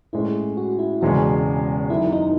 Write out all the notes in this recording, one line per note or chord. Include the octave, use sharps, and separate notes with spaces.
A2 G#3 C#4 E4
F#4
E4
E1 E2 C#3 G#3 C#4 F#4
F#1 F#2 D#3 E4
D#4